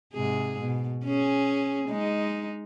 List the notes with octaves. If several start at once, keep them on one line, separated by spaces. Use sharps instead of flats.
G#2 C3 G#4
B2
C#4 G#4
G#3 D#4